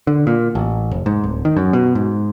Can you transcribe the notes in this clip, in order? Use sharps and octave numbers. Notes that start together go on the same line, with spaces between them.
D3
A#2
A1
F1
G#2
D1
D#3
F#2
B2
G#2